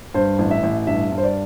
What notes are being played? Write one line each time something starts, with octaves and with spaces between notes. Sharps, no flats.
G2 C5
A1
E5
A1
G2 E5
G2
C5
D5